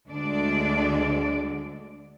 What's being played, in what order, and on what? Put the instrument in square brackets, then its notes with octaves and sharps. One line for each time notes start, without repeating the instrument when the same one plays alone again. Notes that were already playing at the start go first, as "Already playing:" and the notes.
[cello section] D2 D3 G#3 D4 D5